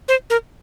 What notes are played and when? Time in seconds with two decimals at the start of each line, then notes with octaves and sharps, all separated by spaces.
0.08 C5
0.30 A#4